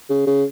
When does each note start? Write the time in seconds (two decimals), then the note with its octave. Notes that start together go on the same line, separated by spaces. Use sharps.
0.10 C#3
0.26 C#3